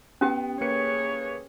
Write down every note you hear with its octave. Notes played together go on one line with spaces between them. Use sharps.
B3 C#4 G4 G5
A#3 G#4 B4 C#5 C#7